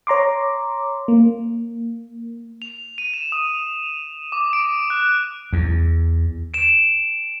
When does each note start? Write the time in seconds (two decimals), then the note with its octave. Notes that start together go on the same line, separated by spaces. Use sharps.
0.07 C#5 A#5 C6 D6
1.08 A#3
2.62 F7
2.98 D#7
3.14 E7
3.32 D#6
4.32 D6
4.53 D7
4.90 F#6
5.53 E2
6.54 D7 E7